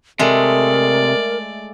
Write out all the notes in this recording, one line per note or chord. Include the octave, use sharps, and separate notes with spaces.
C3 G#3 A3 A#4 D5